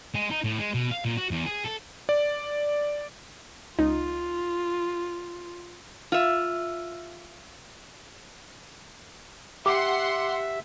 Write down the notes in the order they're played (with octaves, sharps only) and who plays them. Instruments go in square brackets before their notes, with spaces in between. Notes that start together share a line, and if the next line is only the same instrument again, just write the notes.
[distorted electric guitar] G#3
D#4
A2
G#3
B2
F5
A#2
F#4
E2
G#4
A4
[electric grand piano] D5
[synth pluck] C#2 D#4 [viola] F4
[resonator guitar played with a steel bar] F4 E5
[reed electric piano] G4 [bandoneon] E5 [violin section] F#5 C6 [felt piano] D6